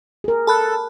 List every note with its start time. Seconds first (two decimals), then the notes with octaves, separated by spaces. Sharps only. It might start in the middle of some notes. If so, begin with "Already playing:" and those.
0.24 G#4 A#4
0.47 A4 A5 B5 F#6